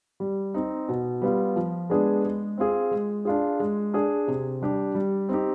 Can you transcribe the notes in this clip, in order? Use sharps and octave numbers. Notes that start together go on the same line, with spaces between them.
G3
C4 D#4
B2
G3 B3 F4
F3
G#3 B3 D4 G#4
G#3
C4 F4 G#4
G#3
D4 F4 G#4
G#3
D4 G#4
C3
G3 D4 G4
G3
C4 D#4 G4